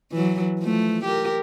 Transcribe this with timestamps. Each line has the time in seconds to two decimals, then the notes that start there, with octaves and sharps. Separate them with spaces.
0.12 E3 F#3
0.60 F3 A3
1.04 G4 A#4